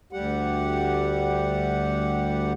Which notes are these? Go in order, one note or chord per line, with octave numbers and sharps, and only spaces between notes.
D2 G3 G4 F#5